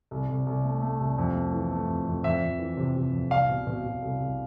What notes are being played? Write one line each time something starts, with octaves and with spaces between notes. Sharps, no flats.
C2
C2
C2
A3
A3
C2
F2
A3
E3
A3
F2
F2
F2 E5
F2
E3
C3
C3
F2
C2 F5
B2
B2
B2
C2
C2